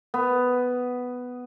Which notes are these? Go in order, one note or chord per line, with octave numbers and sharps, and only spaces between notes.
B3